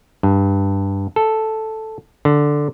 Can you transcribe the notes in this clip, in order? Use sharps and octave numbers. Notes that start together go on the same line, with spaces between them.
G2
A4
D3